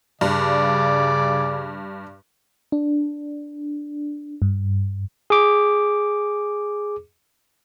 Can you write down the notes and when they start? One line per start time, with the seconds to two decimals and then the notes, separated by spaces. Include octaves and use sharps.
0.21 G2 C#3 D5
2.72 D4
4.42 G2
5.30 G#4 D6